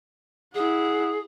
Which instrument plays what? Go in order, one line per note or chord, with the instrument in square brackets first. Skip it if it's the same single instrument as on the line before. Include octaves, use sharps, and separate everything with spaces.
[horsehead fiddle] E4 F#5 [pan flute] G#4